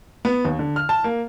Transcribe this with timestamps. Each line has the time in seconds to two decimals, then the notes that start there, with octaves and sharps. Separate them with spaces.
0.25 B3
0.45 D#2
0.59 D3
0.76 F6
0.89 A5
1.04 A#3